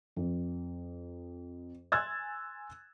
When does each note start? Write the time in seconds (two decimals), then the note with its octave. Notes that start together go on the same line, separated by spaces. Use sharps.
0.16 F2
1.92 G#5 C6 E6 F#6 G#6 A6